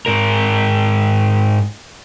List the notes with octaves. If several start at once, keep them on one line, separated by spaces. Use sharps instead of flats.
G#2 A#4